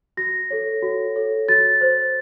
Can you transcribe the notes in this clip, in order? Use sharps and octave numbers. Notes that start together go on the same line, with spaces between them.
F#4 A#6
A4 C#5
F#4
A4 C#5
F#4 A6
C5